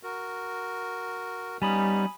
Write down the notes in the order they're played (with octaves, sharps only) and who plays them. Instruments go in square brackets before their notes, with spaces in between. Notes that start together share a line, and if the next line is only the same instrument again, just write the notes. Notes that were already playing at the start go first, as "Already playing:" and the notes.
[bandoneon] F#4 A#4
[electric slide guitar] G3 [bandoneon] B3 C#4 D#4 [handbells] G#5 B5 D#6